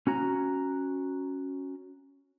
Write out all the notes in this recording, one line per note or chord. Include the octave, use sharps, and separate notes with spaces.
C#4 F#4 A#5